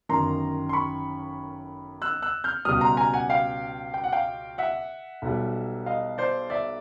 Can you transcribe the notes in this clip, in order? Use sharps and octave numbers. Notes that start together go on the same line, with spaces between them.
G1 F#2 D#3 A#5 C6
C6
B5 C#6
E6 F#6
E6 F#6
F6 G6
C#2 B2 G3 D#6 F6
A#5 C6
G#5 A#5
F#5 G#5
F5 G5
G5
F#5
F5 G5
E5 F#5
B1 B2 G3
D#5 F5
C5 D5
D5 E5